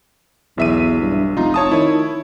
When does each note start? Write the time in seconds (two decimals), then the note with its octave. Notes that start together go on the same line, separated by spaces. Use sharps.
0.58 B1 E2 E5 D#7
1.02 G2
1.37 F1 D#4 F4
1.54 C#5 A5 D#6
1.71 D#3 E4 C#5